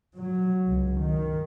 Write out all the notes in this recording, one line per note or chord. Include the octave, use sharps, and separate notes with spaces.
F#3
C#2
D#3